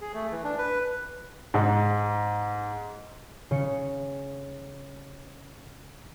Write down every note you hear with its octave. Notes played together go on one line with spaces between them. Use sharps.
G#4
A3
E3
D4
B4
G#2
C#3 C#7